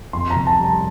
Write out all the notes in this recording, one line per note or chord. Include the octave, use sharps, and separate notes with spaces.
F2 C6
A#5
F1
A5
G3
A5